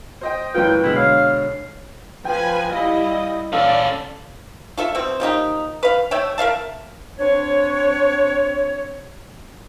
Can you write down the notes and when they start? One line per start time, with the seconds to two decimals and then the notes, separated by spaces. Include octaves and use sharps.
0.21 C5 D#5 G5
0.54 F#2 E3 F4 B4 G5
0.83 B2 D3 G#3 E4
0.96 C#5 F5 C7
2.25 F3 B4 G5 G#5
2.71 G3 E4 D#5 F5 B5
3.53 C#4 A4 D5 F5 E6
4.77 F4 A4 E5
4.95 B2 C4
5.20 F3 A#3 D#4 G4
5.83 B4 F5
6.11 A3 C#5 E5 G5
6.38 A#4 E5 F5 A5
7.19 C4 D4 C#5